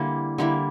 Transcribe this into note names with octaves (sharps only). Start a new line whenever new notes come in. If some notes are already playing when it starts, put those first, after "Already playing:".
Already playing: D3 G3 A#3 E4
D3 G3 A#3 E4